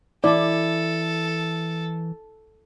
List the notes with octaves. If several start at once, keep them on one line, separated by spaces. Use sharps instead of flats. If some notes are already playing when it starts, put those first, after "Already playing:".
E3 E4 A4 D5